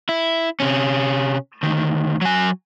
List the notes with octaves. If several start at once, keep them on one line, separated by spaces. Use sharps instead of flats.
E4
C3 C#4
D2 D#3
F#3 G#5